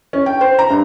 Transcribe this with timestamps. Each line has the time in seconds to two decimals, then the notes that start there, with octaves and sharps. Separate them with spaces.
0.13 C#4
0.26 G5
0.41 C5
0.59 A#5
0.70 G2